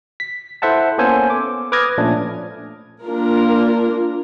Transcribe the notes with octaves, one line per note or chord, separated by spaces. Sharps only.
B6
E4 A4 C5 E5 F#5 A5
A#3 B3 C#4 A4 C5 G#5
D6
B4 D6 D#6 F6 G#6 A#6
A#2 F3 A3 C#4 D4
A#3 D4 F4 A#4